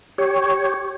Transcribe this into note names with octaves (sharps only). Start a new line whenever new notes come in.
G4 C#5